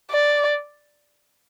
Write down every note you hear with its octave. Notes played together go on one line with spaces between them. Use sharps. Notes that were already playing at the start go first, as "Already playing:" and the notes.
D5